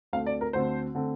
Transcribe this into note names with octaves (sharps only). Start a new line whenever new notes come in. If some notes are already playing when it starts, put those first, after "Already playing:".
D2 D3 A3 C4 F5
D5
A#4
D2 D3 A3 C4 C5
D3 A3 C4